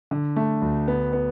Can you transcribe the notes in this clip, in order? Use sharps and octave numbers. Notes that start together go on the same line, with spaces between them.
D3
A3
D2
B3
B3